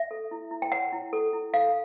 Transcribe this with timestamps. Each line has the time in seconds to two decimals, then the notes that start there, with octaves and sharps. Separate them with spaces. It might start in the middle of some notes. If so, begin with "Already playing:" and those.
Already playing: E5
0.11 A4
0.31 E4
0.51 E4
0.62 G5
0.72 C#5 F#5
0.92 E4
1.13 A4
1.33 E4
1.53 A4 F5